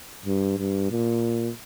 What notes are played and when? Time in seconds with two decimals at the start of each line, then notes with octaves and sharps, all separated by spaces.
0.26 G2
0.58 G2
0.91 A#2